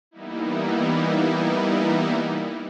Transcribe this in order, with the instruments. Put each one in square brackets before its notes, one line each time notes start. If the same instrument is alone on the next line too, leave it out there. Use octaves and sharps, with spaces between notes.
[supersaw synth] E3 G3 A#3 B3 D#4 E4